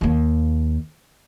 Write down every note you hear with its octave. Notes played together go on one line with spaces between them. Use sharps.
D#2 A#3